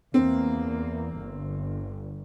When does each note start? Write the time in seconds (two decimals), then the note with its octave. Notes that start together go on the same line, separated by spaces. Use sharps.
0.14 E2 A#3 C4
1.17 G1